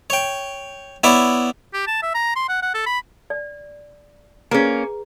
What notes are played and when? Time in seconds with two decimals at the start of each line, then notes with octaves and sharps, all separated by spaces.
0.10 C#5 G5
1.04 B3 E4 C#5 D5 E5
1.74 G4
1.87 A5
2.03 E5
2.15 A#5
2.36 C6
2.49 F#5
2.63 F#5
2.74 A4
2.87 B5
3.30 D5
4.51 A#3 C#4 G#4 B4 A#5